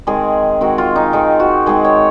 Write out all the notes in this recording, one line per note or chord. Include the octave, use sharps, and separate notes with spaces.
D#3 G#3 C4 G#4
D#3 G#3 C4 F#4
F4
D#4
D#3 G#3 C4 D#4
F#4
D#3 G#3 C4 G#4
C#5